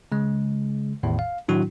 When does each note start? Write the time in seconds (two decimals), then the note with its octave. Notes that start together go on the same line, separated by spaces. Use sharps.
0.12 C#3 G#3
1.03 A1 E2 A2 D#3
1.19 F5
1.49 A2 D#3 F#3 D4 E4 F#4